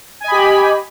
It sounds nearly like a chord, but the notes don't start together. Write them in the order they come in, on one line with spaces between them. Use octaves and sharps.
G#5 D#5 B5 G4